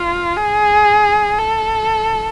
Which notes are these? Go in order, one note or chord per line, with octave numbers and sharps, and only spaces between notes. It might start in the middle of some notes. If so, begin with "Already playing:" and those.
Already playing: F4
G#4
A4